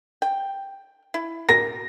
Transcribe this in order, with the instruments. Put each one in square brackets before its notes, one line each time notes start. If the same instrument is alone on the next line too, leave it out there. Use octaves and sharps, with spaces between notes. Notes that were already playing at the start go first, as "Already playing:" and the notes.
[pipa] G5
E4
[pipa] A#4 [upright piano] A#6